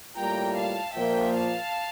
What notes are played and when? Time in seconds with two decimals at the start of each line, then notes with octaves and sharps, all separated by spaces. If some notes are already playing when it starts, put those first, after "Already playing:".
0.17 A2 G3 A#3 F4 G5 A#5
0.56 F5 A5
0.94 A#2 F3 A#3 E5 G5
1.33 F5 A5